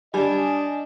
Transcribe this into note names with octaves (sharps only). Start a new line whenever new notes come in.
G3 D4 D#5 G#5